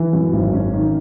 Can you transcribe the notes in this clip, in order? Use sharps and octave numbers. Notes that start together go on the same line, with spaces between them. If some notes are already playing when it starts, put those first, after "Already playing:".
Already playing: E3
F#2
G#1
C#4
D#3